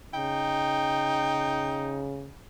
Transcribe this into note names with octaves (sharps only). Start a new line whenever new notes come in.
C#3 D#4 G5